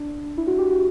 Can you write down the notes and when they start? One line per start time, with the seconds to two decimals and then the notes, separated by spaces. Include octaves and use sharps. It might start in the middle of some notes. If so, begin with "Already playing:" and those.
Already playing: D4
0.37 E4
0.47 F#4
0.58 G4
0.71 F#4